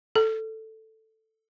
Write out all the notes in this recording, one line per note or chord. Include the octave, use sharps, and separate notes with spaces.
A4